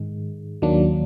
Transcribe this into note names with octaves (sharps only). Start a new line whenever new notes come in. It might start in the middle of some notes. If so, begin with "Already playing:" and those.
Already playing: G#2 D#3 G#3
D#2 D#3 F#3 A#3 D4